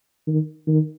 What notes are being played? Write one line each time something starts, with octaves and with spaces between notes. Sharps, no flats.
D#3
D#3